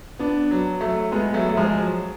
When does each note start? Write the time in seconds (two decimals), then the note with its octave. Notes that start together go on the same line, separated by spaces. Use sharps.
0.19 B3 D4
0.51 F#3
0.81 F#3 A3
1.12 G#3 B3
1.34 F#3 A3
1.49 A3
1.57 F3 G#3
1.81 F#3